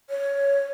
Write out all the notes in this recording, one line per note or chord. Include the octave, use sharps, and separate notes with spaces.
C#5